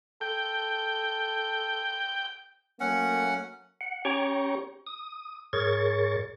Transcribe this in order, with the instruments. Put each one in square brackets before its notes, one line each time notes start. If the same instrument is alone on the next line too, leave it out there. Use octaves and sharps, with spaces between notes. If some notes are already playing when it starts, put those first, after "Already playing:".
[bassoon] A4 [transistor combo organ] G5
[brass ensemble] F#3 A3 A#3 [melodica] C#4 F#5
[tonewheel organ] F#5
C#4 G4 C#5 G5 A#5 C#6
D#6
G#2 G#4 A#4 C#5 C#6 A6